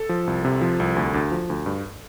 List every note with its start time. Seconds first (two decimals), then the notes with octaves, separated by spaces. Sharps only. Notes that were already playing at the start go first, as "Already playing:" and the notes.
Already playing: A4
0.09 F3
0.27 C2
0.45 C3
0.61 F3
0.80 C2
0.96 D2
1.14 D2
1.31 F3
1.50 D2
1.66 G2